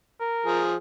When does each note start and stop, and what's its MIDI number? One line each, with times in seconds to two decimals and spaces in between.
0.20 0.62 70
0.46 0.74 53
0.46 0.74 68